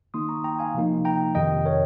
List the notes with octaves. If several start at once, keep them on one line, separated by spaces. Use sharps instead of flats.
D#3 A#3 D#4 C6 D#6
A#5 C#6
G5 A#5
F5 G#5
C3 F3 A#3 D#4
G5 A#5
F2 C3 D#3 D#5 G5
A#4 C#5